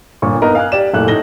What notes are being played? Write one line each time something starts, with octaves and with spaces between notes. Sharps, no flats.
G1 A#2 C#6
B3 D#4 A#4 D#5
F5 G#5 F#6
G4 D5 E7
F#1 A#2 A3 F#6
A2 D#4 A#6 G7